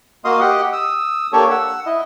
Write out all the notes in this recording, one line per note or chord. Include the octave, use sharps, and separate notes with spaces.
A#3 F#4 D#5 F5 C6 D#6
G4 D#5 F#5
D#6 E6
A#3 D4 G4 A4 C#5 C#6
F#5 E6
E4 D#5